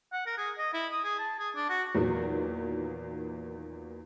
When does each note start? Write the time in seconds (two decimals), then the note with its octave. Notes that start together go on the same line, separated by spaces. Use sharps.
0.13 F#5
0.26 A#4
0.38 G#4
0.58 D#5
0.74 E4
0.92 D#6
1.04 G#4
1.19 A5
1.39 G#4
1.55 D4
1.69 F#4
1.95 E2 A#2 D#3 F#3